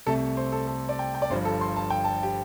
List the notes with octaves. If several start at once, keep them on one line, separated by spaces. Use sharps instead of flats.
C2 C3 A3 A4
C5
A4
A4
D5
G5
G5
D5
G1 G2 F3 C5
A4
C6
A5
G5
A5
G4